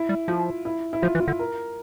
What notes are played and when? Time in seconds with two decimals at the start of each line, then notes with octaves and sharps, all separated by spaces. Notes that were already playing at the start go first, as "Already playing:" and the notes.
Already playing: E4
0.09 G3
0.28 F3 F4
0.65 E4
0.93 E4
1.02 F3 F4
1.15 E3
1.20 F4
1.28 D3
1.39 A#4